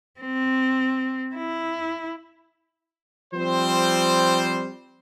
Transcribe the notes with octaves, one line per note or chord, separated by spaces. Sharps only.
C4
E4
F3 G3 C4 C5